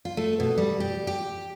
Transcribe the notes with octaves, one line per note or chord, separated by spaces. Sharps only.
F4
A3
B2
G3
G4
G4